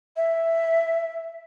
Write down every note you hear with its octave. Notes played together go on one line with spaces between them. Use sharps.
E5